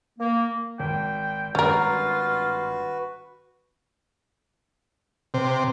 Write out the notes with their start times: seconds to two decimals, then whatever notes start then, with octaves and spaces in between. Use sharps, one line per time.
0.19 A#3
0.79 G#1 G5
1.55 G#1 G2 C#4 F4 F#4 A#4 B4
5.34 C3